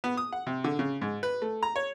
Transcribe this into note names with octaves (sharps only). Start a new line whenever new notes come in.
B3
D#6
F#5
C3
D3
C#3
G#2
B4
A3
A#5
C#5